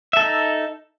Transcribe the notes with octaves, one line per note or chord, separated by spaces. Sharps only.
D#4 A4 E5